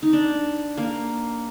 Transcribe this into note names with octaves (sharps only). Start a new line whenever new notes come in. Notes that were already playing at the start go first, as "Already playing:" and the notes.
D#4
D4
A#3